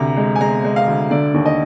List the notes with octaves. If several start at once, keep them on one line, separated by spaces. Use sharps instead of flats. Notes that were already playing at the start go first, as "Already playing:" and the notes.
Already playing: D2 C3 A#5
G#3
G#5
G#3 A#5
G#3
F5
D2
D3 D5
D#2
D#5